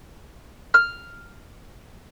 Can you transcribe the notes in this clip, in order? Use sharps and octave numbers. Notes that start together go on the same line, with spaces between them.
F6